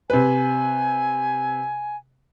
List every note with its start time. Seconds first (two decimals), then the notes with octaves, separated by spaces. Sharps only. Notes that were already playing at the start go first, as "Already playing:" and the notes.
0.10 C3 B4 G#5